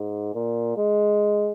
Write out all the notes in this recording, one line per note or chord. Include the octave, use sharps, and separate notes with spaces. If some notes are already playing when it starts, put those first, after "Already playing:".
Already playing: G#2
A#2
G#3